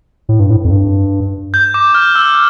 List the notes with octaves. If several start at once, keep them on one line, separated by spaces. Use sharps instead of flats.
A2
G2
A2
F2
G2
G6
D6
F6
E6